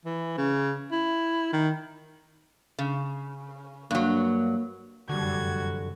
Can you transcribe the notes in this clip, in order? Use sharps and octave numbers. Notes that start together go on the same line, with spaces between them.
E3
C#3
E4
D#3
C#3
G2 F#3 A#3
F1 F#2 D3 G3 F#4 G#6